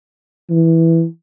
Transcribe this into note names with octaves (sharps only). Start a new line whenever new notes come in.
E3